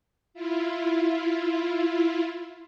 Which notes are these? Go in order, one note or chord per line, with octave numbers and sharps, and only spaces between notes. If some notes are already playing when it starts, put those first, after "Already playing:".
E4 F4